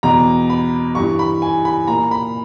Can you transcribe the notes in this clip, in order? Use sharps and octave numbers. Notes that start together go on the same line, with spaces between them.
E2 B2 A#5
B5
G2 E3 C#6
B5
G#5
B5
A#2 A#5
B5